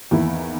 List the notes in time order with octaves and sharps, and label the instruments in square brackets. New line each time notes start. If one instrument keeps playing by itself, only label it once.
[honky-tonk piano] E2 D#3 A#3 E4